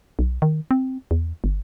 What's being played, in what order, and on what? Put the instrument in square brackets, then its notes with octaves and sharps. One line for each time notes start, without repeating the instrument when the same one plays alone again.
[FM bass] B1
D#3
C4
E2
G1